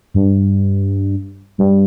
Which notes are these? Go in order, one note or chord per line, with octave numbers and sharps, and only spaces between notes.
G2
G2